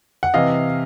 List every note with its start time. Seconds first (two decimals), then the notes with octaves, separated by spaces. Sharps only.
0.23 F#5
0.34 C3 E3 D#5 F5